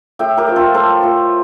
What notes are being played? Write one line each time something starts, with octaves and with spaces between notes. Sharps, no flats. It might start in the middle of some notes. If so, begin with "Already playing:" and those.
A2 E5 G5
G4 A#4
F3 A3
F4 A4
A2 A4 C5
F3 A3